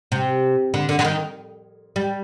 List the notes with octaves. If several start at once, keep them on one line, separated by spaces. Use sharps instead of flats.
C3
D3
D3
D3
D#3
G3